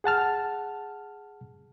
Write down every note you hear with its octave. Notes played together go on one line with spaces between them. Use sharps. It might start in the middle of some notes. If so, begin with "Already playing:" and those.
G#4 F#5 A5 F6